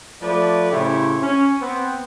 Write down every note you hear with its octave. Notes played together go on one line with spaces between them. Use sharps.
F3 A3 B4 D5
A2 C#3 E4 G4 C5 C#5
C#4
B3 C4